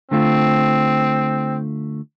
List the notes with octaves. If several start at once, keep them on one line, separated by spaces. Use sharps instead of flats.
D3 A3 C4 F4